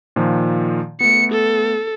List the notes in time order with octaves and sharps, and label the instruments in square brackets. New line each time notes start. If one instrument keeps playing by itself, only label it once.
[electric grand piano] A#2 D#3 F3
[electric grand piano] A3 B3 [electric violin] C#7
[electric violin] A4